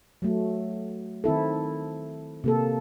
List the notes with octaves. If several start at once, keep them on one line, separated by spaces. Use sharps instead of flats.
F#3 A3
D#3 C4 E4 A4
C3 A#3 A4